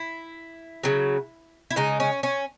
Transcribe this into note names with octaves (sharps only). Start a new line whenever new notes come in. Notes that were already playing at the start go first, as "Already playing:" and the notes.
Already playing: E4
C#3 F#3
E4
C#3 G#3 D#4
C#4
C#4